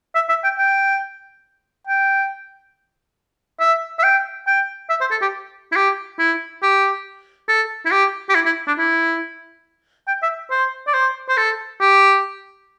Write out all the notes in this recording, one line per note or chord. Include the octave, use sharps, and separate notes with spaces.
E5
E5
G5
G5
G5
E5
E5
G5
G5
E5
C5
A4
G4
E4
G4
E4
G4
A4
E4
G4
G4
E4
E4
D4
E4
G5
E5
C5
D5
C5
C5
A4
G4